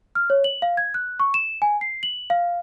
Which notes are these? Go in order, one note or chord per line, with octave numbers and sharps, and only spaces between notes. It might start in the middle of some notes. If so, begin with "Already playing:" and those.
F6
C#5
F#7
F5
G#6
F#6
C#6
E7
G#5
C7
F#7
F5